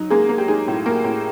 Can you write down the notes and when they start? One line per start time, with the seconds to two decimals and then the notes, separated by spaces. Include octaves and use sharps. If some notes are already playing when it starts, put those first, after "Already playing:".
Already playing: F#3 D#4
0.10 G#3 A#3 G#4
0.29 A#3
0.38 G4
0.48 G#3 D#4 G#4
0.68 A2
0.86 A#3 A#4
1.04 A2